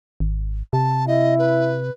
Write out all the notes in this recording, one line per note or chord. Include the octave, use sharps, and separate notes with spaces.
G#1
C3 A5
E4 D#5
B4